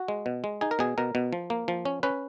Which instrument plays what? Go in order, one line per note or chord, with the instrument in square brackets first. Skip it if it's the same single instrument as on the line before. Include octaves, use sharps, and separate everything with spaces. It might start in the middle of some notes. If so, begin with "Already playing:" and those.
Already playing: [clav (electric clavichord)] F#4
G#3
B2
G#3
D#4 G#4
A#4
B2 G#4
B2 A#4
B2
F3
A#3
F3
C#4
C#4 B4